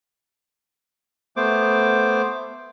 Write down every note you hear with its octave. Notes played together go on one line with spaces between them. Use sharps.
A3 B3 C5 D6